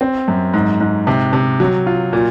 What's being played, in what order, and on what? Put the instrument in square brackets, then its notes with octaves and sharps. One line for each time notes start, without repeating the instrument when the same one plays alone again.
[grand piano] C4
F#2
G#2
G#2
C3
C3
F#3
F4
A#2